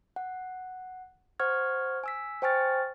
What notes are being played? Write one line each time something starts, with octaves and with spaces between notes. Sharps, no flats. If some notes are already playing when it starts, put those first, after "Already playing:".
F#5
C5 F#5 C#6 F6 G#6
G#5 E6 B6
C5 G5 G#5 C#6 F6 A6